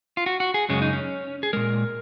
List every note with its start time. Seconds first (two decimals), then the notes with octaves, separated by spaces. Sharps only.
0.17 F4
0.26 F#4
0.40 F#4
0.54 G#4
0.69 F#2 C#3 G#3 C#4
0.82 D#4
0.93 C#4
1.43 G#4
1.53 A#2 G#3 A#4